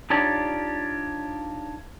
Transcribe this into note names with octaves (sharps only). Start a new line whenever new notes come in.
D4 D#4 F4 G4 C#5 D5